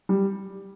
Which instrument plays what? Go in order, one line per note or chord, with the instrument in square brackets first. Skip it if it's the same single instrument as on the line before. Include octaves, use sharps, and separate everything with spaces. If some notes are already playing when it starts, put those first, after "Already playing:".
[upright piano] G3